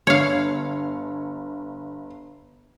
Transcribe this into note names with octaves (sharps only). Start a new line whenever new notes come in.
G1 C#5 F5